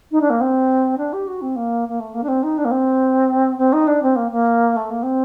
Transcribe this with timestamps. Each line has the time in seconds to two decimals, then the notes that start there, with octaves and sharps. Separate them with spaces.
0.11 D#4
0.21 D4
0.30 A#3
0.41 C4
0.98 D4
1.13 G4
1.27 F#4
1.41 C4
1.56 A#3
1.88 A#3
2.00 A3
2.14 A#3
2.23 D4
2.28 C4
2.43 D#4
2.58 D4
2.65 A#3
2.71 C4
3.58 C4
3.73 D#4
3.87 D4
4.02 C4
4.16 A#3
4.31 A#3
4.76 A3
4.90 A#3
5.03 C4